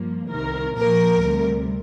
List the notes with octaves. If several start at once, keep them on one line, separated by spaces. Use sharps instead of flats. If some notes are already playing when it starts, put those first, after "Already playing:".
Already playing: G2 F3 A#3
C2 C3 D#3 A#4
A#2 F3 A#3 A#4
D2 C3 G3